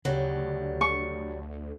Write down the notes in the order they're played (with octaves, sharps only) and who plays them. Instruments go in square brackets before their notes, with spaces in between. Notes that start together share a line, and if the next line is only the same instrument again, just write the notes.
[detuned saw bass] D2 [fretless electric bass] C#3 [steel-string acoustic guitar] F#3 G3
[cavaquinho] C#6